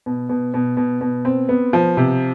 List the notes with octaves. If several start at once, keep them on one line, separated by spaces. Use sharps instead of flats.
B2
B2
B2
B2
B2
C4
B3
F3
C3